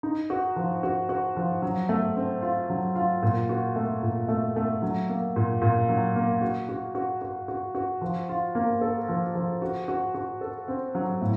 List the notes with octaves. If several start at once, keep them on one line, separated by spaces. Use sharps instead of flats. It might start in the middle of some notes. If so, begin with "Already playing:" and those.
D#4
F#4
F3
F#4
F#4
F3
F#3
A3
C4
F4
F#3
F4
A#2
F#4
A3
A#2
A3
A3
F#3
A#3
A#2
A#2
F#3
A#3
F#4
F#4
F#4
F#4
F#4
F#4
F3
F4
A#3
A4
F3
F3
F#4
F#4
F#4
A4
C4
F#3
A2